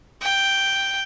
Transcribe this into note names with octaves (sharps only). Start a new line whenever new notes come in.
G5